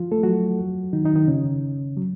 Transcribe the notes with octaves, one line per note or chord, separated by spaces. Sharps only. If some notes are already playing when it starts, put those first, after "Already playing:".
Already playing: F3 F4
A3 A4
F#3 F#4
D#3 D#4
D#3 D#4
D#3 D#4
C#3 C#4
F#3